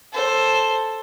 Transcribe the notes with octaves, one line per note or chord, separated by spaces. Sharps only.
A4 C5